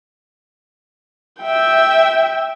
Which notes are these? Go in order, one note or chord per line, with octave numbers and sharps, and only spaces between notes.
E5 G5